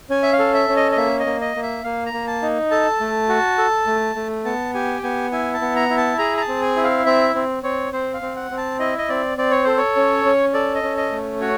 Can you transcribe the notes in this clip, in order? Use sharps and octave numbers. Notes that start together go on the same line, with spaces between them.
C#4 G#5
E5
F5
A4
E5
C#4
D#5
D#5
A#3 E5
D#5
A#3
D#5
A#3
E5
A#3 F5
A#5
A#3
A5
D#4
A4 A5
A3
F#4
A4
A3
A3
B3 A5
G4 G#5
G5
B3 G#5
E4 G#5
A5
B3
A#5
E4
A5
G#4 A#5
A#5
A5
C4
G#5
E4
F5
C4 E5
C4
C4 C#5
C4 C5
F5
C4
F#5
C4
A5
E4 D#5
D#5
C4 D5
C4 D5
C#5
A4 C5
C#5
C#4
C#4
A4 D5
D#5
C#4
D#5
A3
F#4 C#5